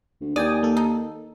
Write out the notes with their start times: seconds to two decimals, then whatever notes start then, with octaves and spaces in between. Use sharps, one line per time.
0.21 D2
0.36 D#2 D5 G5 G#5 D#6
0.63 A#3 A4
0.77 D#4